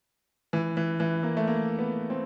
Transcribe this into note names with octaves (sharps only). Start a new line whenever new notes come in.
E3
E3
E3
A#3
A3
A#3
B3
C4